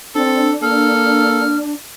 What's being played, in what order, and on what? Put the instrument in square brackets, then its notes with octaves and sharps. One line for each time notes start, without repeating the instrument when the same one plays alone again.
[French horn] C4 [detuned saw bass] D4 [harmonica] A4
[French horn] A#3 [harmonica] A4 [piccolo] F6